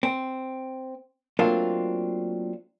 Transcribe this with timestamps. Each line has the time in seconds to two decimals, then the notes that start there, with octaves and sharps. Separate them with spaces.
0.03 C4
1.39 F#3 A3 A#3 C4 D4 F4